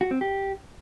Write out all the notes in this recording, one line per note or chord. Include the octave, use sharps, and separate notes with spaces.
F#4
C4
G4